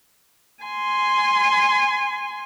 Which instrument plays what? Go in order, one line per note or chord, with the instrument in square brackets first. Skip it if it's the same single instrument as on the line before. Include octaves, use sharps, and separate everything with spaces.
[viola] G#5 C6